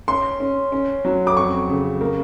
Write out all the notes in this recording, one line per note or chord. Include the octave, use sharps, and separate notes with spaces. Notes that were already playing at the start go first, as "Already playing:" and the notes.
C#4 C6
C#4
C#4
F#3
D6
F2 C#6
C#3
A#3